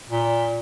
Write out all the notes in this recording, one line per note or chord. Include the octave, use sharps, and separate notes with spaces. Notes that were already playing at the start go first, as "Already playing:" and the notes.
A#2